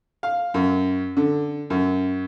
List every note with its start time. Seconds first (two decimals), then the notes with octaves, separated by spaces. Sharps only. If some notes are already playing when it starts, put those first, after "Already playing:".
0.23 F5
0.54 F#2
1.17 D3
1.70 F#2